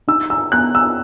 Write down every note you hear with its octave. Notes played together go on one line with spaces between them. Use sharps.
D#4 E6
E6
B3 F#6
E6